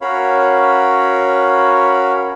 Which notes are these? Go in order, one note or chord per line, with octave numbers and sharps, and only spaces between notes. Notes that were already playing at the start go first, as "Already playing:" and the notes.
C#4 F#4 A#4 C#5 F5 B5